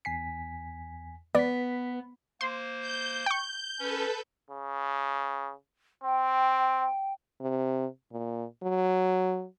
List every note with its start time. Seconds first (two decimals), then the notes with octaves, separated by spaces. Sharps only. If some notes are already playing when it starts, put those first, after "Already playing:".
0.05 E2 G#5 B6 C7
1.35 B3 B4 D5 B6
2.41 A#3 C5 C6
2.80 G6
3.26 G5 C#6
3.79 C#4 A4 B4
4.51 C#3
6.04 C4 G5
7.41 C3
8.12 A#2
8.62 F#3